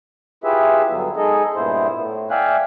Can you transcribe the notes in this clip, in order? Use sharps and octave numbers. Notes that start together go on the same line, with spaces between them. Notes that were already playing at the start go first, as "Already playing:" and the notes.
E4 F4 G4 G#4 B4 E5
G2 D3 F#3 B3
G#3 D#4 G#4 A4 D#5
G2 A#2 B3 E4 C5
A2
D5 E5 F5 G5 G#5 F#6